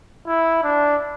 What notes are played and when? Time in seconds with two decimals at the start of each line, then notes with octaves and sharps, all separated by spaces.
0.27 E4
0.63 D4